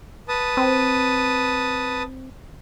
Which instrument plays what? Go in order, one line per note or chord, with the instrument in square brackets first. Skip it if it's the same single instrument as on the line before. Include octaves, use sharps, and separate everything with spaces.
[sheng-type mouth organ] B4 A5 D#6
[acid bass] C4